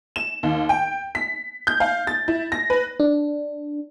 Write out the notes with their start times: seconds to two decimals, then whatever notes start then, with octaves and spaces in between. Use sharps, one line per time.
0.16 E7
0.43 D#2
0.69 G5
1.15 B6
1.67 G6
1.80 F5
2.07 A6
2.28 E4
2.52 A#6
2.70 B4
3.00 D4